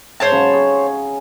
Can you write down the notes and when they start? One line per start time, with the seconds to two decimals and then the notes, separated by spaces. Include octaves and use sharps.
0.20 G#2 C5 C#5 A5
0.32 C#3 F#3 B5
0.53 G#4